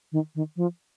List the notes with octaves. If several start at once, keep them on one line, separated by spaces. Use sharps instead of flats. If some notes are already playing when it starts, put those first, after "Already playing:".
D#3
D#3
F3